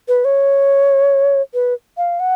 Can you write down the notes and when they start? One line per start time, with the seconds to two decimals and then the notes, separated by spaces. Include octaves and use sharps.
0.08 B4
0.25 C#5
1.54 B4
1.97 F5
2.20 F#5